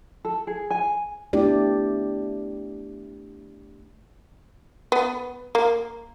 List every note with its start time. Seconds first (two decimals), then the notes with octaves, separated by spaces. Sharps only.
0.25 A4
0.47 G#4
0.70 G#5
1.33 A3 B3 D4 E4 G4 D5
4.92 B3
5.55 A#3